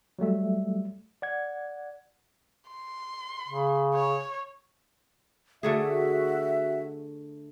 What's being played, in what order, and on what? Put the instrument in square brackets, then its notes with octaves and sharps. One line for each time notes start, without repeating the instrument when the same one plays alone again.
[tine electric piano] F#3 G3 A3 E5
D5 F#5 G#6
[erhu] C6
[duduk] C#3
[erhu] C#5
[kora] D3 A3 G#4 [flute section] F#4 E5